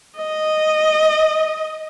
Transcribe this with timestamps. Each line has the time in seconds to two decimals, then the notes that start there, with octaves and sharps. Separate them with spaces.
0.18 D#5